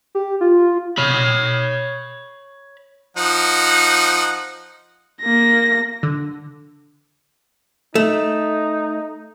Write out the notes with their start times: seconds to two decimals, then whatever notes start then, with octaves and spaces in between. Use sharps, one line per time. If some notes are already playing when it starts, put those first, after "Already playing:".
0.15 G4
0.41 F4
0.98 C#5 B5
3.17 F3 D#4 F#5
5.22 A#3 A#6
6.03 D3
7.95 A3 D#4